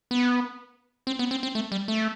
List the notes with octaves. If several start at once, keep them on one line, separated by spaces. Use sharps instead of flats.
B3
C4
B3
C4
C4
A3
G3
A3